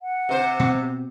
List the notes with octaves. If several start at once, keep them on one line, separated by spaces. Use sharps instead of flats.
F#5
C3 C5
B2 C4